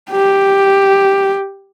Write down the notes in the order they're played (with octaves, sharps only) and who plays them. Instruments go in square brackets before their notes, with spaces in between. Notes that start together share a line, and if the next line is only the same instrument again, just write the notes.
[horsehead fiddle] G4